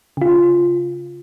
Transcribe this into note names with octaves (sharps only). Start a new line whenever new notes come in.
C#3 F4